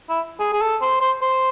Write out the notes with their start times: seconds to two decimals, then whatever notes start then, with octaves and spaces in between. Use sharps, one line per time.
0.10 E4
0.40 G#4
0.53 G#4
0.61 A4
0.82 C5
1.01 C5
1.22 C5